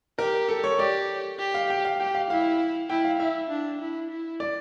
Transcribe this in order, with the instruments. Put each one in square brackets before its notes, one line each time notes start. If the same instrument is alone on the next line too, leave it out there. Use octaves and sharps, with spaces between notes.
[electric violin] G4 [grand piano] A#4
[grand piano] A4
C#5
[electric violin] G4 [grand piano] D5
[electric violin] G4
[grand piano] F5
G5
F5
[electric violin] G4 [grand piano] G5
[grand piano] F5
[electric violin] E4 [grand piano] F5
[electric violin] E4 [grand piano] G5
[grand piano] F5
[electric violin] E4 [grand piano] E5
[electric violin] D4
E4
E4
[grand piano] D5